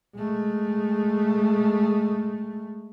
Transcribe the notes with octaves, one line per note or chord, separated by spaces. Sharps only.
G#3 A3